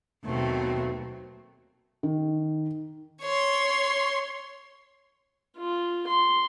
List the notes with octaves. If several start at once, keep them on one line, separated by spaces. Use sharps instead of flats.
D#2 B2 F#3 A3 C4
D#3
C#5 C6
F4
C6